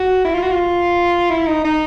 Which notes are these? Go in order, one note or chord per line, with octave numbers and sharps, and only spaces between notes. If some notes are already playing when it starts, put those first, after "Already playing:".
Already playing: F#4
E4
F4
F#4
F4
E4
D#4
D#4